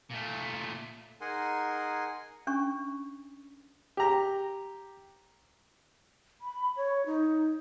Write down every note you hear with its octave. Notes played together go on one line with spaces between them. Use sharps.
A#2 A3
D#4 G#4 A#4 F#5 G#5 C6
C#4 D4 C#6
G4 A#5
B5
C#5
D#4